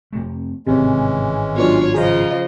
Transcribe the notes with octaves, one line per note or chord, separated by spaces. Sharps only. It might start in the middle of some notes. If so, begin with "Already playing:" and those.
F2 C3 A3
G#1 A2 C3 E3 G#3 C#4
F#3 B3 D4 F4 C#5
C#3 F3 G#4 C5 D#5 F5 A#5 D#6